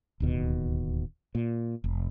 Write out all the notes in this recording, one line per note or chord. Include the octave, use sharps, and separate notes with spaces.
D1 D#2 B2
A#2
F1